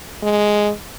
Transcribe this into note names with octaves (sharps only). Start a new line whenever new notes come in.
G#3